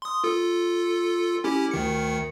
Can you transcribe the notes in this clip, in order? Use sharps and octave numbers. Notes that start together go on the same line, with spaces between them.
C6 D#6
F4 A4
C#4 E4 G4
D2 D#3 C#7